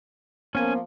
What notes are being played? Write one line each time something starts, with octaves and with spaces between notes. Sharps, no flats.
F3 A#3 B3 C#4 G#5